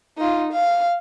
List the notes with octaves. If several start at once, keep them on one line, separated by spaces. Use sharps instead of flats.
D#4 F4
F5